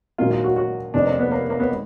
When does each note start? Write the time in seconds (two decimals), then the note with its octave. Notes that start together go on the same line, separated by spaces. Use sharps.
0.18 A#1 G#2 D#3 F#3 A#3 F4
0.31 F4
0.44 F#4
0.56 F#4
0.94 F1 F2 D#3 D4
1.06 A#3
1.19 B3
1.31 A#3
1.50 A#3
1.60 B3
1.70 D#3 G#3